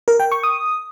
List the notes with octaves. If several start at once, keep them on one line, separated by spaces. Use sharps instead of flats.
A#4
G5
C#6
D#6